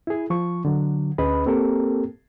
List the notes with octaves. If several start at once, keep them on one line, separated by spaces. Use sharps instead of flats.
E4 G#4
F3 C#6
D3 F#3
D2 C#4 G#4 B4 D#5 B5
A#3 C4 G4 A4 A#4